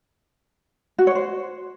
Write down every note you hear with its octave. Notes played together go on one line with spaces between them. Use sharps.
F#4
C#5
C5